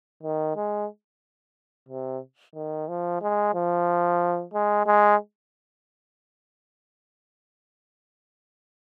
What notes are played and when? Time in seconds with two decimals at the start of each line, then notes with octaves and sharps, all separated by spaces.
0.23 D#3
0.56 G#3
1.88 C3
2.55 D#3
2.88 F3
3.22 G#3
3.54 F3
4.54 G#3
4.86 G#3